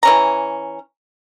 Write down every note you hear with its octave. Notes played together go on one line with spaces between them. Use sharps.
E3 C#4 A#5